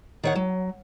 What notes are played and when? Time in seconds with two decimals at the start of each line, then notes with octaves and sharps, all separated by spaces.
0.24 D#3 C#5 F#5
0.36 F#3